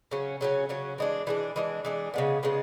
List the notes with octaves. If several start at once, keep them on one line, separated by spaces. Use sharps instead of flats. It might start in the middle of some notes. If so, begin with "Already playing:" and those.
C#3 F#3 C#4
C#3 F#3 C#4
C#3 F#3 C#4
E3 G#3 D4
E3 G#3 D4
E3 G#3 D4
E3 G#3 D4
C#3 G#3 B3
C#3 G#3 B3